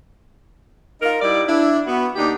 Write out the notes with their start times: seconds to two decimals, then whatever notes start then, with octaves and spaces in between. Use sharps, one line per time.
1.01 D#4 F4 A#4
1.21 G3 D#4 E4 D5
1.47 D4 E4
1.86 B3 F#4
2.15 D#2 D4 D#4 G4